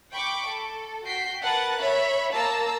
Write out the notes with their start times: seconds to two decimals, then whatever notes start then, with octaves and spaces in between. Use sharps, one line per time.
0.13 G5 B5 C#6 D6
0.47 A4
1.05 F#4 G5 B6 C7
1.43 A#4 B4 F#5 A5 F#6 A6
1.80 C#5 E5 B5
2.32 A#3 A5 A#5 E6